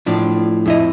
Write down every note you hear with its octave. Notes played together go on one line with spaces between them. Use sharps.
A2 F3 D4
F2 E4 D#5